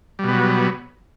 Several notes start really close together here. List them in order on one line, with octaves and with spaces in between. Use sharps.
G3 B2 B3 F#3